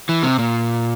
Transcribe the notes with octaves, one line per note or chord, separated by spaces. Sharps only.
E3
C3
A#2